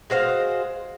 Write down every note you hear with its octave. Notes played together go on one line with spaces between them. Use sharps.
G#3 F#4 C5 F5